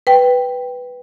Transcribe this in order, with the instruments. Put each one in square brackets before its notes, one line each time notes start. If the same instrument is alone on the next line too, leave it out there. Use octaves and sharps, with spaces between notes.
[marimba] B4 G5